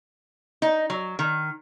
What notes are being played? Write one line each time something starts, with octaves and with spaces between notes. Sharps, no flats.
D#4
F#3
D#3